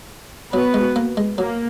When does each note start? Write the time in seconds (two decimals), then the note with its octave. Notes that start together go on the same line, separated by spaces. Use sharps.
0.53 F#3 B3 F#4 B4
0.74 G#3
0.96 A#3
1.17 G#3
1.38 F#3 A#3